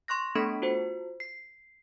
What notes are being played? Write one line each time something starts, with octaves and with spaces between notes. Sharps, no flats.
C6 C#6 F#6 A#6
A3 B3 D4 A4 B5 B6
F4 F#4 C5
C7